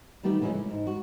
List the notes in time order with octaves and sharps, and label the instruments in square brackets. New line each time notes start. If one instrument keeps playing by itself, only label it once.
[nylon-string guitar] D#3 G3 A3 B3 G4
C#3 E3 G#3 A3 C#4
E4
G#2
F#4